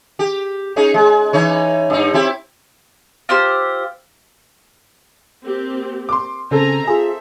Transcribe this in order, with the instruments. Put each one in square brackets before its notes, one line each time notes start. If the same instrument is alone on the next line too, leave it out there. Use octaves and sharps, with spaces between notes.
[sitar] G4
C#4 D#4 G#4
G#3
E3 D#4 C#5
G2 D#4
C4 E4 G4
[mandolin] F4 G4 C5 E6
[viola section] A#3 C4 G4
[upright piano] C6 D6
[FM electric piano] C#3 [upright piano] C4 A4 [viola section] G#5 A#5
[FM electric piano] F4 G#4 [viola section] E5